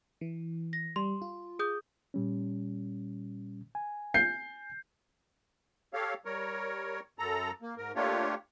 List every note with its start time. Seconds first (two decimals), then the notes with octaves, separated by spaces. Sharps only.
0.21 E3
0.73 A#6
0.96 G3 C6
1.22 F4
1.59 G#4 D#6 G6
2.14 A#2 G3 C#4
3.75 G#5
4.14 G6 C7
5.94 G4 A4 C#5 F5
6.25 G3 A#4 C#5
7.19 F#2 A4 A#5
7.62 A#3
7.77 G#2 A#4
7.96 A3 A#3 D4 F4 G4 C#5